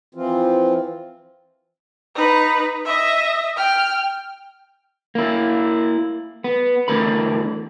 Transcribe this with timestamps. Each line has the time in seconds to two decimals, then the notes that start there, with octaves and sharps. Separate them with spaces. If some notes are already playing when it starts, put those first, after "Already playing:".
0.15 E3 F3 C4 F4
2.15 D#4 B4
2.85 D#5 E5
3.57 G5 F6
5.15 A#3 E4
6.44 B3
6.88 E2 D3 F#3 A3 A#4 B5